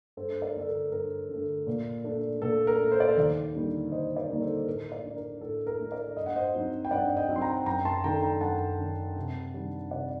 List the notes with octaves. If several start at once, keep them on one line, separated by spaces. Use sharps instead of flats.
G2 A4 C5
A#4 D5
D3 A3 A4
A#4
G2 A#4
D3 A3
A#2
A3 D4
A#2 A4
A#4
A3 D4
C5
D5
A4 C5
D#2
D3 G3 A#3 D#4
D#2 C5 D#5
A#4 D5
D3 G3 A#3 D#4
A4 C5
A2 A#4
A#4 D5
A3 D4
A#4
A2 A4
A#4
A3 D4
A#4 D5
G2 D#5
F#5
C5 D#5
F#3 C4 D#4
G5
G2 D5 F#5
D#5 G5
F#3 C4 D#4
C6
G5 A#5
F#2 G5 A#5
A5 C6
D#3 A3 D4 G5 A#5
G5 A#5
F#2 F#5 A5
D#3 A3 D4
C3
D#3 G3 D4
C3 D5 F#5